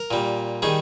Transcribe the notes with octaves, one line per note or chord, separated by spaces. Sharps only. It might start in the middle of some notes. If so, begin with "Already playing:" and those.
Already playing: A#4
A#2 G3
D#3 G3 G#4